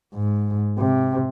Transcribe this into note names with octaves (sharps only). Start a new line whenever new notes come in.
G#2
C3